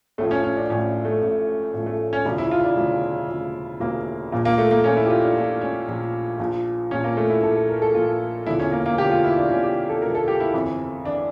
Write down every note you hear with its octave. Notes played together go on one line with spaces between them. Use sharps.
A1 A2 F3 A3
C#4
C#4
D4
A1 A2 F3 C#4
A3
A1 A2 F3
A1 A2 F3
A3
C#4
E1 D2 C#3 F3 D4
E4
F4
D4
E1 D2 C#3 F3
E1 D2 C#3 F3
E1 D2 C#3 F3 A#3
A#1 A#2 F3 A#3
A#3
A3
A#3
A#1 A#2 F3 C#4
E4
G4
F4
D4
A#1 A#2 F3
C#4
A#1 A#2 F3
A#1 A#2 F3
A#1 A#2 F3 C#4
A#3
A3
E4
A#1 A#2 F3 A4
A4
A#4
A4
A#1 A#2 F3 F4
E1 E2 D3 F3 E4
C#4
A#3
A#3
E1 E2 D3 F3 G4
F4
E4
D4
E1 E2 D3 F3 C#4
G4
A4
E1 E2 D3 F3 A#4
A4
G4
E4
G1 F2 E3
E3 D4